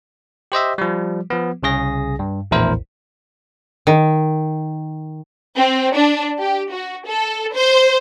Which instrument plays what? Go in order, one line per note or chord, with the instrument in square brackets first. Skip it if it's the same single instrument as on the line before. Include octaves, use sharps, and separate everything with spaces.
[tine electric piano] G4 C5 D#5 E5
F3 G3
F3 B3
C2 C#3 G#4 A#6
G2
A#1 E2 A2 E4 A#4 C5
[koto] D#3
[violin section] C4
D4
G4
F#4
A4
C5